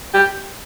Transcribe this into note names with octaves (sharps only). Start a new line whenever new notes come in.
G4